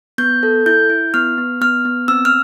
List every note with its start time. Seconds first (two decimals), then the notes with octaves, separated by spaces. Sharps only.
0.18 B3 G6
0.43 A4
0.66 E4 G6
0.90 E4
1.14 B3 F6
1.38 B3
1.61 B3 F6
1.85 B3
2.08 C4 E6
2.25 F6